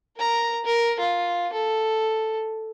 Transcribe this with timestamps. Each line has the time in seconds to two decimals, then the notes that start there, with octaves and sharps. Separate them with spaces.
0.17 A#4 A#5
0.64 A#4
0.99 F4
1.53 A4